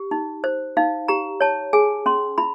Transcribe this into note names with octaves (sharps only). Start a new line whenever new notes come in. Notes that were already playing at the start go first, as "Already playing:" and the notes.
Already playing: G4
D#4
C5
D#4 F5
G4 A#5
C#5 A5
G#4 G#5
C#4 C6
E4 B5